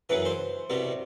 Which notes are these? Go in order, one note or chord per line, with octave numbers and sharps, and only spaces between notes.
F#2 C#3 E3 B4
C5
C2 B2 G3